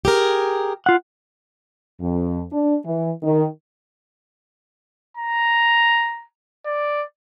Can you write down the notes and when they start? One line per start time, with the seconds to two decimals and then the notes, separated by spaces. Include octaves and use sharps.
0.05 G4 G#4 A#4
0.86 F4 F#5
2.01 F2
2.52 D4
2.84 E3
3.23 D#3
5.17 A#5
6.66 D5